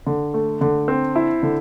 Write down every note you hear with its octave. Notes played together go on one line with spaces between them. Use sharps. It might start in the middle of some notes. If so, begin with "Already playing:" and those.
D3
A3
D3
C4
E4
D3